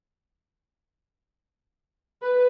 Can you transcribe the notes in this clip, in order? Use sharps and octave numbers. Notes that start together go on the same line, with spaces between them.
B4